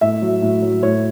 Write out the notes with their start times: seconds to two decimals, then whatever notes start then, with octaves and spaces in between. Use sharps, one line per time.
0.01 A2 E5
0.22 F#3
0.42 A2
0.62 F#3
0.82 A2 C#5